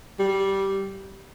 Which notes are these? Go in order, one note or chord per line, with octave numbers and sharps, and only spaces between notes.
G3